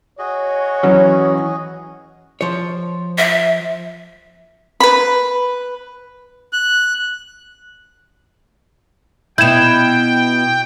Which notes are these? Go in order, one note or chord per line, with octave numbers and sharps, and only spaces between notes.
F#4 G#4 C#5 D#5
E3 F#3 C#4
F3 C#5
E5
B4 B5
F#6
B2 E4 G5 G6 G#6 E7